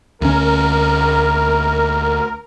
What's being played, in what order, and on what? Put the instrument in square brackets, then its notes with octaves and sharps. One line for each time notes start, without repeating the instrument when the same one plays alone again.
[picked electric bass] D2 C#4 [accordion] A#4